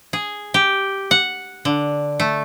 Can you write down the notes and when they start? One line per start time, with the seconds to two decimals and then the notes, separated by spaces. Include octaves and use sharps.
0.13 G#4
0.54 G4
1.11 F#5
1.65 D3
2.20 A3